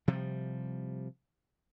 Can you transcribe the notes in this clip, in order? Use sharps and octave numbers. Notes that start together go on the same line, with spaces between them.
C3 F3 G3